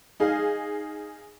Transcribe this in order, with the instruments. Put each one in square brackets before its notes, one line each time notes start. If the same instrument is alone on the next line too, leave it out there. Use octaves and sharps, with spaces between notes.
[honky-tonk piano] D#4 G#4 F5